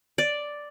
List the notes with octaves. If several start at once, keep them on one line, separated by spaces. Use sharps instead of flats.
D5